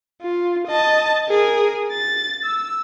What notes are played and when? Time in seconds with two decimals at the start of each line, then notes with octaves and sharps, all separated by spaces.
0.21 F4
0.68 D#5 A5
1.29 G#4 A#4
1.92 A6
2.45 E6